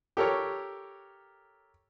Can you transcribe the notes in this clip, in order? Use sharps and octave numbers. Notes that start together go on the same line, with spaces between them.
G4 A4 A#4 C#5